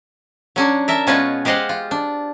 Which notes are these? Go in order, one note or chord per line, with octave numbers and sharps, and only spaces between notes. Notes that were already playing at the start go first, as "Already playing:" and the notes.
F#3 C#4 D4
A#4 E5 A5
B2 G#3 C#4 F4 B4
G#3 G4 C5 D#5 F5 F#5
F4
D4